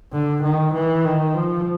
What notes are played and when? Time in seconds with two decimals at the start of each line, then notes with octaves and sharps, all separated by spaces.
0.13 D3
0.44 D#3
0.75 E3
1.05 D#3
1.35 F3